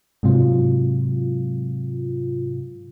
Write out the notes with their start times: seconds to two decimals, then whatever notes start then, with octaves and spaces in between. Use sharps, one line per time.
0.23 G#2 C3 F#3 F4